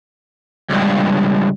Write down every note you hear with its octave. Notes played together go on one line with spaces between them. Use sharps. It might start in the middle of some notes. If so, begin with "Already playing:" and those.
C#2 G2